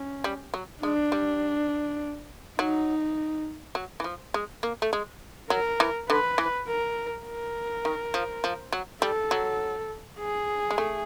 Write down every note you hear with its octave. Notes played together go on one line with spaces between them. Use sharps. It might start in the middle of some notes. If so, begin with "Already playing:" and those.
Already playing: C#4
G3
F#3
G#3 D4
G3
F#3 D#4
F#3
E3
F3
G#3
A#3
A3
G#3
F#3 A#4
E3
D3 B4
E3
A#4
A#4
D#3
F3
F3
F#3
G3 A4
F#3
G#4
G#3
A3